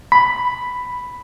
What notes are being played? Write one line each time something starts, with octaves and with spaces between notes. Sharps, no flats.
B5